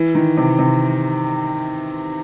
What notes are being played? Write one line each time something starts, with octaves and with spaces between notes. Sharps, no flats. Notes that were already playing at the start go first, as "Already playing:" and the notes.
Already playing: E3
D#3
C3
C3